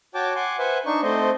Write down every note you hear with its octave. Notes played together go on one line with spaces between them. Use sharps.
F#4 C#5 G5 A5 D6
F#5 G#5 C6 D6
B4 C5 E5 F#5 G#5
D4 D#4 C#6
A3 C4 C5 D#5